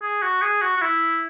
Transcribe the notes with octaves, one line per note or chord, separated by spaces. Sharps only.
G#4
F#4
G#4
F#4
F#4
E4